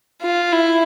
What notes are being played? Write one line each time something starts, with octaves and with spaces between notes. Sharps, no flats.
F4
E4